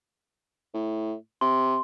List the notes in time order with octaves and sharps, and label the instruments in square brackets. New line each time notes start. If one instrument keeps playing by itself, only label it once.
[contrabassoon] A2
[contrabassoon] C3 [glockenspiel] C6